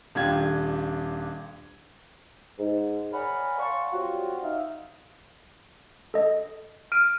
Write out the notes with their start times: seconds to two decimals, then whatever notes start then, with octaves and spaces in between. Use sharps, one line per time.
0.15 D#1 D4 F4 G4 G#6
2.58 G#2
3.12 A#4 C#5 D5 F#5 G#5 B5
3.59 D5 F5 F#5 A5 C6 C#6
3.92 F#3 G3 C4 F4 F#4
4.43 D#4 E5 F5
6.14 A4 D#5
6.92 F6 D7 D#7